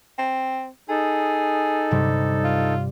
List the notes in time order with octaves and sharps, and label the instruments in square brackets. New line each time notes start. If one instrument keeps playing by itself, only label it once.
[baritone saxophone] C4
[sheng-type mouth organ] D#4 A4 [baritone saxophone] G#4
[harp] G2 C3 G3
[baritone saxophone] F4